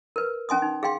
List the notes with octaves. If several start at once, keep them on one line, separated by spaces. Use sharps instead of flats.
A#4 B4
C#4 G#5 C6 D#6
D#4
G#4 F5 G5 C6